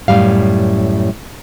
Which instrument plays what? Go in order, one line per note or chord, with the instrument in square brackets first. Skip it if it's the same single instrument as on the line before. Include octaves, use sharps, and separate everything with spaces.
[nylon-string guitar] F#2 A2 C#3 G3 F5